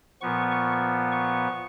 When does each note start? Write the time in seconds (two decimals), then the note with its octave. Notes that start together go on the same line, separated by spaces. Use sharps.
0.21 A#2 F3 B3 C#6
0.51 C#6
1.12 C#6